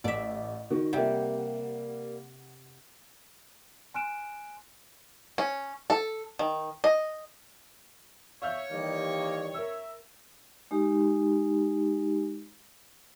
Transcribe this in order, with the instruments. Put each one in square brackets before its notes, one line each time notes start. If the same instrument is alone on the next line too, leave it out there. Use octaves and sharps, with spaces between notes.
[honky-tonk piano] A1 [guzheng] D5 E5
[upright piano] D#3 [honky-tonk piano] F#4
[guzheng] C3 [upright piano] G3 A#3 [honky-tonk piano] F#5
[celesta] G#5 C6 F6 F#6 D7 E7
[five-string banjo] C#4
A4
D#3
D#5
[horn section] C#5 [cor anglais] E5 [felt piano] F5 F6 G6
[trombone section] D#3 E3 G3 [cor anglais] A#3
[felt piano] A#4 E6 [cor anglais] E5
[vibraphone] G#3 D#4 G4